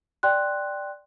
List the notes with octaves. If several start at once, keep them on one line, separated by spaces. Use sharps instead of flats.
D5 G5 C6 F#6